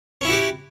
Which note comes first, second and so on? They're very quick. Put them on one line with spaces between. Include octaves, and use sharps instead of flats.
C#4 E4 F#4 G4